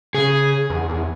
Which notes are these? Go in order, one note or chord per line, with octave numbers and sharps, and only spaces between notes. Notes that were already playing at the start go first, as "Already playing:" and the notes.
C#3 G#4
E2
E2